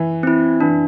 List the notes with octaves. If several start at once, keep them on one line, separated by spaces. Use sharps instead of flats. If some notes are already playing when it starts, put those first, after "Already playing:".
Already playing: E3
C4 E4
E3 D4